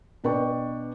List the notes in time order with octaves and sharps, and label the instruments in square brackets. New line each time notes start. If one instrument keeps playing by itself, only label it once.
[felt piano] B2 D4 B4 G5 C#6